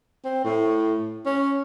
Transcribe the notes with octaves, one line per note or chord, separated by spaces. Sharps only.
C4
A2
C#4